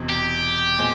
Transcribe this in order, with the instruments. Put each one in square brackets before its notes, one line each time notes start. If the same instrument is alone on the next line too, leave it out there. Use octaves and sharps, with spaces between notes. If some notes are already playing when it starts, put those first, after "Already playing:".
Already playing: [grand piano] E1 E2 C3
[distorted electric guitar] G4
[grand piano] A#2 G#3 C4